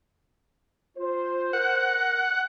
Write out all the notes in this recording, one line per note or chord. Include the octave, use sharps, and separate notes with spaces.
F4 C5
A#4 F#5